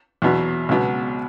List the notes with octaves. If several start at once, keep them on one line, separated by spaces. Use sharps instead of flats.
E2 B2 F#3
C#2 B2 F#3